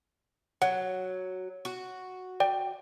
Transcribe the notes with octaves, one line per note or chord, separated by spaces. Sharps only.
F#3 F#5
F#4
D5 G5